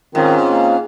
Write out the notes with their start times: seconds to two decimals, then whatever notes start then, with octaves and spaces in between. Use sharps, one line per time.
0.15 G#2 D#3 C4 C#4 F4
0.51 A#3